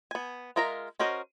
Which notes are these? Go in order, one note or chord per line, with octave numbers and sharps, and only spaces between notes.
B3 G#5
G#3 F4 A#4 E5 A#5
C#4 F#4 A#4 C5 D#5